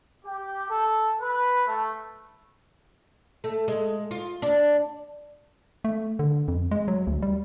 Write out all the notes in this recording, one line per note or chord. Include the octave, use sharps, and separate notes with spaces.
G4
A4
B4
A3
A3
G#3
F4
D4
A3
D3
F2
G#3
F#3
D2
G3